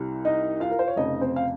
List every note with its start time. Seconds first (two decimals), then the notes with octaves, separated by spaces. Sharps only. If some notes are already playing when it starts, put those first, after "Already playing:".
Already playing: C2 C3 G3
0.25 D#4 D#5
0.60 F4 F5
0.70 A#4
0.79 C5
0.88 C#5
0.96 F1 F2 C#3 D#4 D#5
1.21 C4 C5
1.36 F5